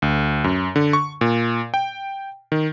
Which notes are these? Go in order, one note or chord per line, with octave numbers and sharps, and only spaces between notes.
D2
F#2
D3
C#6
A#2
G5
D#3